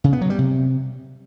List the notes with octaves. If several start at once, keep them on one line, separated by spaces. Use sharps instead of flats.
C#3
B3
F#3
G3
C3